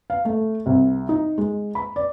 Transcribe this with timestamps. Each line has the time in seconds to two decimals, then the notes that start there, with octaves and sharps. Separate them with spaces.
0.10 F5
0.25 A3
0.66 C2
1.09 D#4
1.38 G#3
1.75 B5
1.96 D5